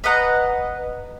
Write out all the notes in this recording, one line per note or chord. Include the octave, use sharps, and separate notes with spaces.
B4 D#5 F#5 A#5